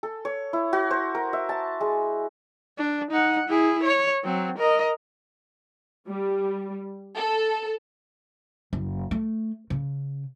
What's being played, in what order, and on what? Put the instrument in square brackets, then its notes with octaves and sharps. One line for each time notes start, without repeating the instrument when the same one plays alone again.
[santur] A4
C#5
E4
F#4
C5
A#4
E5
A5
G#3
[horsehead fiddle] D4
D#4 F#5
E4 G#4
C#5
F#3 C4
A#4 D#5
[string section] G3
A4
[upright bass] F#1
A3
C#3